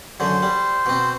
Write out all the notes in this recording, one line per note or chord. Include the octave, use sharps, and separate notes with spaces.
F#2 D3 C5
G3
B2 C4